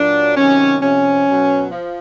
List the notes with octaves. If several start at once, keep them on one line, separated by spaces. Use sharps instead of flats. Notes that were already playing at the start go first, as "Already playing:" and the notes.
Already playing: A#2 F#3 D4
C3 D#3 F#3 C#4
C3 F3 C#4
B2 F#3
F3